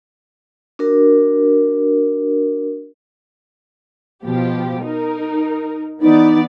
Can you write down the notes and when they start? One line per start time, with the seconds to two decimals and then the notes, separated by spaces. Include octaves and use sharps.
0.79 D4 F#4 A#4
4.25 B2 F3 G4
4.82 D#4 A#4
6.01 E3 B3 D#4 D5